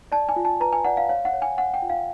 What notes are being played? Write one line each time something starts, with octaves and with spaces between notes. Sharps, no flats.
D5 A5
G#5
F4
A5
B4 A#5
G#5
D5 F#5
F5
C#5 F5
F#5
C#5
G#5
C#5 F#5
G5
F4
F5